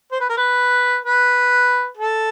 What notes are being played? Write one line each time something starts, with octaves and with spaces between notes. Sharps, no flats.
C5
B4
A#4
B4
B4
A4